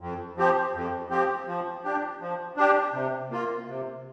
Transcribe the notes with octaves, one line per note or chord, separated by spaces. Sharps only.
F2
F3 C4 G4
F2
F3 C4 G4
F3
D4 G4
F3
D4 G4
C3
A#3 F4
C3